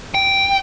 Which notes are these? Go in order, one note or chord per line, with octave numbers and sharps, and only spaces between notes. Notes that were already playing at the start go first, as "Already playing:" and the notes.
G5